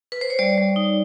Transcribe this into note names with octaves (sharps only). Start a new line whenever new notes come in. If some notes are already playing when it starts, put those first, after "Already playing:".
B4
C5
C#5
G3 D5
G3
D#4